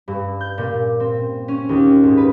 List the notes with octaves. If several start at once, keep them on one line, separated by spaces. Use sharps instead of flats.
G2
G6
A#2
C4
C#4
D#2
G#2
B4